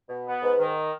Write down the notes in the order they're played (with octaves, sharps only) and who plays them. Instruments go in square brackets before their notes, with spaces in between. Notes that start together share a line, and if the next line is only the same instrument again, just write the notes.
[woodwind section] B2
B3
[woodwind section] G#2 [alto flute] B4
[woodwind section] D#3